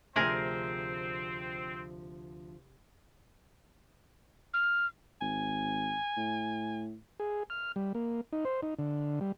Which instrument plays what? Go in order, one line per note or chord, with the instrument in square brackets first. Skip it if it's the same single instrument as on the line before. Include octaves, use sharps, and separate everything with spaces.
[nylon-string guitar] D2 F3 [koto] C3 G#4 A#4 [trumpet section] C4
[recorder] F6
[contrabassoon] G#1 [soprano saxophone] G#5
[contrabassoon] A2
[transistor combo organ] G#4
F6
G3
A#3
D#4
C5
D#4
D3
G3